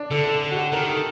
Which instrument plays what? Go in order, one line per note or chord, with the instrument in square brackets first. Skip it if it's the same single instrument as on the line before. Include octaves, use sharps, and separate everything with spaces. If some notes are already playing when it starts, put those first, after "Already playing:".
Already playing: [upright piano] D4
[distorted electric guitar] D3 [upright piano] A4
[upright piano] A4
A4
F#4
G4
[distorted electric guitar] D#3 [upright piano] A#4
[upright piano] A4